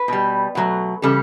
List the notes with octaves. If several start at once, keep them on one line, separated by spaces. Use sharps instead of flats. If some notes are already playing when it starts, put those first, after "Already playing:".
Already playing: B4
B2 G3
B2 F#3 A3
C#3 E3 G3 A4